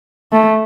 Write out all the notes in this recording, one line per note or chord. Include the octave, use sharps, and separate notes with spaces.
A3